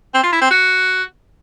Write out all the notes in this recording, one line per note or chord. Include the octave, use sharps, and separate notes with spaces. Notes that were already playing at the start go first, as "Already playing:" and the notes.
C4
F4
E4
C4
F#4